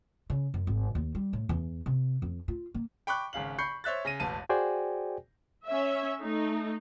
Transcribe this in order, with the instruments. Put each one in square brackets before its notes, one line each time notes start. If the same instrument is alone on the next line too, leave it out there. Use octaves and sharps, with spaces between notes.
[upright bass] C#3
F#2
G#1
D#2
G3
A2
E2
C3
F2
F4
A#3
[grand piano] G5 B5 C#6 D6 F#6
G#1 C#3 F5 F#7
B5 C#6 G6 C7 C#7
C5 C#5 E5 F#6 A6
C#3 A#6 D#7
E1 A1 A5 D#7
[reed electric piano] F#4 G#4 C5 D5 G5 G#5
[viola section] C#4 E5
A3 D#4